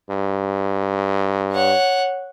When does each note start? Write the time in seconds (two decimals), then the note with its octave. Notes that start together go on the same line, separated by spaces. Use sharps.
0.10 G2
1.52 C#5 F#5